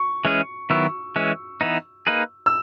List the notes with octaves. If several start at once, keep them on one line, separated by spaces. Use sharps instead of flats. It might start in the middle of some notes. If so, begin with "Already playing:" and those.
Already playing: C#6
E3 G#3 C#4 G#4
D#3 F#3 B3 E4 C#6 E6
E3 G#3 C#4
E3 B3 D#4
A#3 D#4 G#4 B4
E6